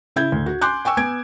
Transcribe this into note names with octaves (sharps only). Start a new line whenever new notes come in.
C#3 E4 G6 G#6
D2
F#4
G#5 C6 D6 F#6 G6
G5 G#5 C#6 E6
B3 G#5 G#6 D7